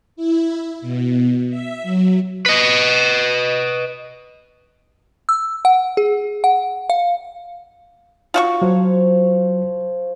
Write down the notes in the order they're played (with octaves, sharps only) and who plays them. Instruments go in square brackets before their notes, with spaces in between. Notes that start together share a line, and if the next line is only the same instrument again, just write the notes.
[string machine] E4
B2
E5
F#3
[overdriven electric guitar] B4 D#5
[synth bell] E6
F#5
G#4
F#5
F5
[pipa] F4 F#4 C#6
[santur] F3 C#5 F5 [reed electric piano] F#3